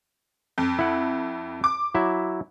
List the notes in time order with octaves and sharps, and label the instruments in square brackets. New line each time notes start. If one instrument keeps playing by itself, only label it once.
[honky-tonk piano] F2
[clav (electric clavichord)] E4 F#5
[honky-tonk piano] D6
[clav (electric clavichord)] F#3 E4 E5